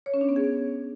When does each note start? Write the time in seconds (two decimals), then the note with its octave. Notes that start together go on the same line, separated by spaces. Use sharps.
0.06 C#5
0.14 C#4
0.21 D4
0.29 B3
0.36 G#4